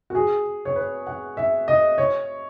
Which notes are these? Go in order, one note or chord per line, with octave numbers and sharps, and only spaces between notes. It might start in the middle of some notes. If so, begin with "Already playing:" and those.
F#4
G#4
C#5
B4
F#5
E5
D#5
C#5